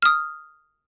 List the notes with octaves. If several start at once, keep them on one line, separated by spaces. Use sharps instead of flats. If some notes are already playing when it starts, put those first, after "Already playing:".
D#6 F6